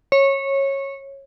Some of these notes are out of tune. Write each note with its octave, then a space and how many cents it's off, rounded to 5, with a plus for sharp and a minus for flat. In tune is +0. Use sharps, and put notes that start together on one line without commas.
C#5 -20